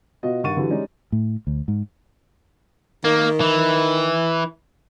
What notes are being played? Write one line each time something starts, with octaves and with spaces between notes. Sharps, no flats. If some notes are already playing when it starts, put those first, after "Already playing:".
B2 F4 F#4 D#5 F5
G2 D#3 F#5 C#6 A6 D#7
D3 E3 F#3 G3
G3 G#3 C#4 D#4 D5
A2
D2
G#2
D#3 A#3
E3